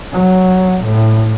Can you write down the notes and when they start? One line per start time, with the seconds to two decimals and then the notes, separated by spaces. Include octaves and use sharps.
0.13 F#3
0.84 A2